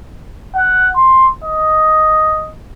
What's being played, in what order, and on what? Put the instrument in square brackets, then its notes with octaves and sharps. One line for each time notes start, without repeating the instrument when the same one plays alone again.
[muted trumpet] F#5
C6
D#5